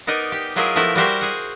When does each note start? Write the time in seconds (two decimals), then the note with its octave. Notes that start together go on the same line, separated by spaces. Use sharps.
0.07 B3 D#4 A#4 D5 D#5
0.32 G4
0.56 F#3 E4 F4 G#4 A#4 D#5
0.75 F3 A3 B3 E4 A#4
0.95 G3 E4 F#4 G4 A#4 C5
1.21 G#4 F#5